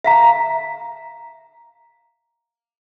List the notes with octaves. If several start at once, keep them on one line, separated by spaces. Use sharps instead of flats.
E5 F5 A#5